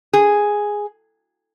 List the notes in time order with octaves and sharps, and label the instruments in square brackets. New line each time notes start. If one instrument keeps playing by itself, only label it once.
[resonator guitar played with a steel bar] G#4